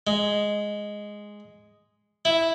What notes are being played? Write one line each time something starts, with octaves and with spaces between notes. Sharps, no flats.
G#3
E4